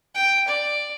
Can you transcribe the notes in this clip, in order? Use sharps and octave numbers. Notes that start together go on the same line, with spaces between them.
G5
D5